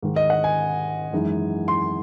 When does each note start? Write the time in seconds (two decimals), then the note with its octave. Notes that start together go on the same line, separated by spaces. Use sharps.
0.02 G#2 D#3 G#3
0.16 D#5
0.30 F#5
0.44 G#5
1.13 F#2 E3 G#3 D#4
1.68 C6